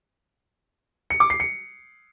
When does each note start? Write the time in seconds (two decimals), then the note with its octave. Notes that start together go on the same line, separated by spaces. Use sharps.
1.10 C#7
1.20 D6
1.30 C7
1.40 C#7